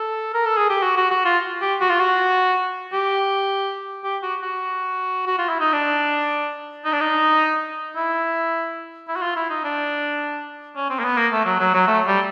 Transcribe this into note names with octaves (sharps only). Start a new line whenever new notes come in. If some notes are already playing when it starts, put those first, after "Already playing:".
Already playing: A4
A#4
A4
G#4
G4
F#4
F#4
F#4
F4
G4
F#4
F4
F#4
G4
G4
F#4
F#4
F#4
F4
E4
D#4
D4
D#4
D4
D#4
E4
E4
F#4
F4
E4
D#4
D4
C#4
C4
A#3
B3
A#3
A3
F#3
F#3
F#3
A3
G3